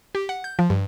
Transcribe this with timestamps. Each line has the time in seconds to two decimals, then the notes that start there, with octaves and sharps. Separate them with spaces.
0.15 G4
0.29 F#5
0.44 G6
0.59 F3
0.70 G2